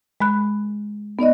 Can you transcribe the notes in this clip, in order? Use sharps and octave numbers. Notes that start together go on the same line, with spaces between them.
G#3 B5 F#6
B3 D#4 D5 D#5